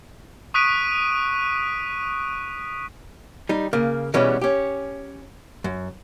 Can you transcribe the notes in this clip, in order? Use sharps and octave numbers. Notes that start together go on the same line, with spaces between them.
C#6 D#6 F#6 B6 D7 D#7
G3 D#4
C#3 A#3
B2 E3 G3 G#3 B3 C#4
C#4 G4
F#2